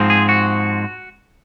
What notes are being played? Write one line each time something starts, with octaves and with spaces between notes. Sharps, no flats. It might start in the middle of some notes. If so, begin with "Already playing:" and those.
Already playing: G#2 F3 G#3 C4
G#4
F#4